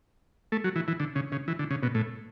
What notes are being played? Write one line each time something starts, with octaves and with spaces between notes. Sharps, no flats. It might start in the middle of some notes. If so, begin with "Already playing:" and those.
A3
F#3
E3
E3
D3
C#3
C#3
E3
D3
C#3
B2
A2